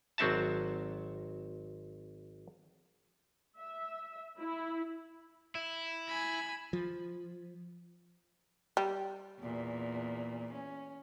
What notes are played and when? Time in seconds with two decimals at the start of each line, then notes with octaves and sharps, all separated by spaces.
0.18 G#1 F#3 C4 F#4 E5 A5
3.58 E5
4.38 E4
5.55 E4
6.08 G#5 B5
6.73 F3
8.77 G3
9.40 E2 A#2
10.52 C#4